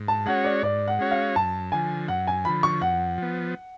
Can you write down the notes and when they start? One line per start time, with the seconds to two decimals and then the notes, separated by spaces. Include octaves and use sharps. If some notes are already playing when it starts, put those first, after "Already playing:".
Already playing: G#2
0.08 A5
0.26 G#3 C#4 F#4 C#5 F#5
0.44 D5
0.63 G#2 D5
0.88 F#5
0.99 G#3 C#4 F#4 C#5
1.11 F5
1.35 F#2 A5
1.72 D3 F3 G#5
2.08 F#2 F#5
2.27 G#5
2.45 D3 F3 B5
2.63 C#6
2.81 F2 F#5
3.18 F3 B3